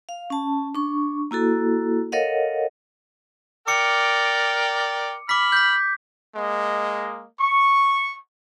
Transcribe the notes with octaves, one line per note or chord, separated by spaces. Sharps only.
F5
C#4 A5
D4 C#6
A#3 E4 F#4 A4
A4 A#4 C#5 D#5 F5 F#5
A#4 D5 G5 D6 C#7
B5 D6 F6 B6
G6 B6
G#3 A#3 D#5
C#6